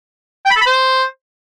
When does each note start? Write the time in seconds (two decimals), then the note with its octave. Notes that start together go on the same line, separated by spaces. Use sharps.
0.46 G5
0.51 B5
0.56 A4
0.61 B5
0.66 C5